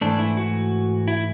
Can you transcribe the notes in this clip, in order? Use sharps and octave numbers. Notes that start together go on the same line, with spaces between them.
G#2 E3 A3 D4
E4
F#4
E4